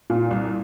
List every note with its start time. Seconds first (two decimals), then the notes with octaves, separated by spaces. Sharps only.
0.10 A#2
0.31 C2